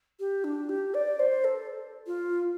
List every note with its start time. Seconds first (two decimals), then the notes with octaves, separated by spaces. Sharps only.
0.19 G4
0.44 D4
0.69 G4
0.94 D5
1.19 C5
1.44 A4
2.07 F4